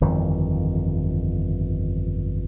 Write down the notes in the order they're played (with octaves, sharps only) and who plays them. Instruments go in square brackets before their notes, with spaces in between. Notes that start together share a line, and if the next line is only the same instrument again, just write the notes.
[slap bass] G1 F2 D#3 E3